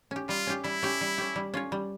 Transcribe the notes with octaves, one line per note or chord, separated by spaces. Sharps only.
C#4 G4
G3 F4
C#4 G4
G3 E4
C#4 G4
G3
C#4 G4
G3
C#4 F4 C#5
G3